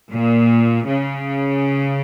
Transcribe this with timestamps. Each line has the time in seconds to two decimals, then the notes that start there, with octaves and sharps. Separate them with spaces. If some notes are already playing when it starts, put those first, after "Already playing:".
0.10 A#2
0.86 C#3